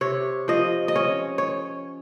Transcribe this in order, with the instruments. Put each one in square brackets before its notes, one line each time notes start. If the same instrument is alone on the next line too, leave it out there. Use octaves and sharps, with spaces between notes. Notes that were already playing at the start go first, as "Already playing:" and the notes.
[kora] C3 C#5
F3 D#5
D#5
C#4 C#5
C#5